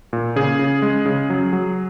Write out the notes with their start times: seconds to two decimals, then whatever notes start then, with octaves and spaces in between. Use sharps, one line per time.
0.13 A#2
0.36 C#3 G#4
0.59 C#3
0.82 G#3
1.06 C#3
1.30 F#3
1.53 F#3